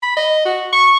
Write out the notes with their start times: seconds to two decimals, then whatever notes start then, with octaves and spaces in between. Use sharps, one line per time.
0.03 B5
0.17 D#5
0.46 F#4
0.72 C#6